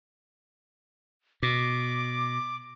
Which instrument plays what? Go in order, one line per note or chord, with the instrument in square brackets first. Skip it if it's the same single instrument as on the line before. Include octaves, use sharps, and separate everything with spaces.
[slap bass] B2 [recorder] D6